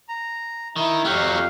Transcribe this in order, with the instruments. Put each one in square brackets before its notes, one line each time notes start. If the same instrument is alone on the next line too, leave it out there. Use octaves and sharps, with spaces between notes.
[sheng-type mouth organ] A#5
[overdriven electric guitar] D#3 [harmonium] E4
[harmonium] F2 F5 [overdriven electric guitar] F#3 A3 [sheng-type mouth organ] G4 F#5